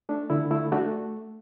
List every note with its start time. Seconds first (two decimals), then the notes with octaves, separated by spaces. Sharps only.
0.09 A3 D4
0.30 D3 E4
0.51 A3 E4
0.72 A3 D4 F#4